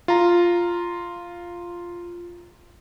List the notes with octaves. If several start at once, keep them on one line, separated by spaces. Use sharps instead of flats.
F4 A#5